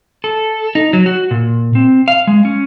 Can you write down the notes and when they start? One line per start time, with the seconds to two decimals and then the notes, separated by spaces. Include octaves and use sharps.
0.24 A4
0.75 D#4
0.93 F#3
1.06 F#4
1.31 A#2
1.75 C4
2.08 F5
2.27 G#3
2.45 C#4